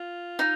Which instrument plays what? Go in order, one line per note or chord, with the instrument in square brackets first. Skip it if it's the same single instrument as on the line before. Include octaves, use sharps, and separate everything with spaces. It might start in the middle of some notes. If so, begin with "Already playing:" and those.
Already playing: [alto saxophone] F4
[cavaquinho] D#4